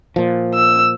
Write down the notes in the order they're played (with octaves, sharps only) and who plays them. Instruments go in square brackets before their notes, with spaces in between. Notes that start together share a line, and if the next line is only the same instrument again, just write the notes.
[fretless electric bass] A#2 F3
[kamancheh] E6